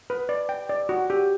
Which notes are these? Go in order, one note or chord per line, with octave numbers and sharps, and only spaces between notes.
B4
D5
G5
D5
F#4
G4